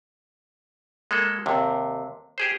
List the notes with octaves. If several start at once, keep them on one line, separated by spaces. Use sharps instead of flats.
G#3 A#3 A4
D#2 C3
G4 G#4 C5